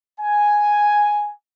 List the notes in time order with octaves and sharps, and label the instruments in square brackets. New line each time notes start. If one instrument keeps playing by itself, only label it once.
[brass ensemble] G#5